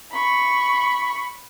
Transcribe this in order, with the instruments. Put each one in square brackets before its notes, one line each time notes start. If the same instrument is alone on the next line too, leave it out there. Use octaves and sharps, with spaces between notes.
[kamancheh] B5 C#6